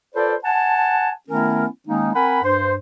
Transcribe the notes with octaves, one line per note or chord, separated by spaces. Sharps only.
F4 A4 B4 C5 D5
F#5 G#5 A5
D#3 A3 B3 C#4 E4 A#4
D#3 G#3 A#3 C#4 D#4
C4 A#4 F#5 G#5 B5
G2 C5